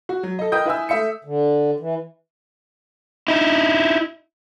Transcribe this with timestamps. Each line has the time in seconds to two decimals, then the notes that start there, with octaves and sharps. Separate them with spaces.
0.09 F#4
0.23 F#3
0.39 A4 D#5
0.52 A#4 B4 D#5 G5 D#6 G6
0.66 E4 B4 E5 G#5 E6
0.89 A3 E5 C#7
1.24 D3
1.80 E3
3.28 D#4 E4